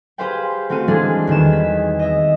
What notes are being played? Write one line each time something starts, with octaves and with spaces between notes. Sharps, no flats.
G4 G#4 B4 C5 F5 G5
A3 C4 F#4 F5 D#7
E3 G3 G#3 D4 G#4 A4
E2 D#3 B3 E7
B6
D#5 E5